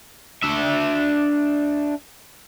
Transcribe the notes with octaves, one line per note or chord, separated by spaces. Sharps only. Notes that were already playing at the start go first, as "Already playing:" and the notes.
D4 E5